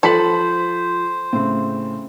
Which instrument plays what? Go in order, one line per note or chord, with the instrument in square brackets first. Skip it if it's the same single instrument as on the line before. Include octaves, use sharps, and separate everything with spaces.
[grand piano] F3 B6 F#7 [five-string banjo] A4 B4 A5 [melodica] C5
[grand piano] A2 C#3 C4